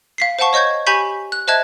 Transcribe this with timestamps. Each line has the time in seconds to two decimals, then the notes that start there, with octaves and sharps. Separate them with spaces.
0.18 F5 B6 C7
0.39 C5 F5 F#5 A5 C#6
0.53 C#5 D#5 C#6 G6 G#6
0.87 G4 G#5 B5 C#6 G6 B6
1.32 F#6
1.48 C5 D#5 E5 A5 F#6 G#6